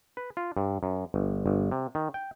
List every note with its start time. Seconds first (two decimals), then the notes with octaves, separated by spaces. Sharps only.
0.17 B4
0.37 F4
0.57 G2
0.83 F#2
1.14 G1
1.46 G1
1.72 C3
1.95 D#3
2.14 G5